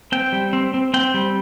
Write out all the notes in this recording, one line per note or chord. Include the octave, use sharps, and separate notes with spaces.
C4 G5
G3
C4
C4
C4 G5
G3